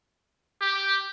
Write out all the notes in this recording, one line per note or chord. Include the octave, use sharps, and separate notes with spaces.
G4